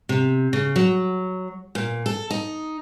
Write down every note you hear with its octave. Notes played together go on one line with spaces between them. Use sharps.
C3
C#3
F#3
A#2
A4
D#4